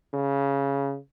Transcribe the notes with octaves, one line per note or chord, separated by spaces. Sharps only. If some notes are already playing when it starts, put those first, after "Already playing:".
C#3